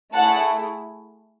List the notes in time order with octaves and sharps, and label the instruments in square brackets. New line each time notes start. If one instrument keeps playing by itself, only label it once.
[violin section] A3 E4 G#4 F#5 A5